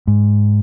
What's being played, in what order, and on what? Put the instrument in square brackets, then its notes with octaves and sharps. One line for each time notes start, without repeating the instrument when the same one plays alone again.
[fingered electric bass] G#2